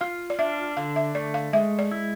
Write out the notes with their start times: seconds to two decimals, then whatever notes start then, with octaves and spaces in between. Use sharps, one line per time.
0.01 F4 F5
0.30 D5
0.39 D4 E5
0.77 D3 F5
0.96 E5
1.15 A3 D5
1.34 F5
1.53 G#3 E5
1.79 D5
1.91 E4